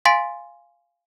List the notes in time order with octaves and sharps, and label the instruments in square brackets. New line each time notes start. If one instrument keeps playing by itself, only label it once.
[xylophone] F5 G#5 C6 A6 B6 D7